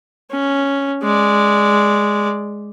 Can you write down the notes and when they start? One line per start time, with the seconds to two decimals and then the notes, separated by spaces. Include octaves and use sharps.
0.31 C#4
1.03 G#3 D5